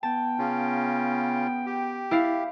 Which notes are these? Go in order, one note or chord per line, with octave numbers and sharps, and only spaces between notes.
B3 G5 A5
C#3 C#4 F4
G4
E4 D5 F5